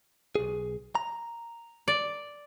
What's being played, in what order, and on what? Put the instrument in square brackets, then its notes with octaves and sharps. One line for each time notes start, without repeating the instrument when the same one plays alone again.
[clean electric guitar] B1 G#4
A#5
[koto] D5